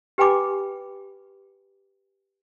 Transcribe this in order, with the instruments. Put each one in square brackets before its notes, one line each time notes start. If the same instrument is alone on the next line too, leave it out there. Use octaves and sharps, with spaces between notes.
[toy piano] G4 B4 G5 G#5 B5 D6